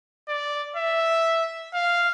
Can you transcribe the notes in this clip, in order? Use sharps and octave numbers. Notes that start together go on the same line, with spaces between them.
D5
E5
F5